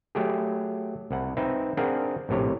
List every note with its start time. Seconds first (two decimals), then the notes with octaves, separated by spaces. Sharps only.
0.15 F#3 A3 G4 G#4
1.11 C2 F#5
1.37 C4 D#4 B4 E5
1.77 C4 D4 G#4 A#4 F5 F#5
2.29 A#1 A2 C3 C#5